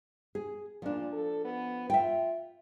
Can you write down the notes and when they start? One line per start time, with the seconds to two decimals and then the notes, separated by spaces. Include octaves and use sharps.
0.35 G#4
0.82 A#2 F3 D4
1.12 A4
1.44 B3
1.90 F4 E5 G5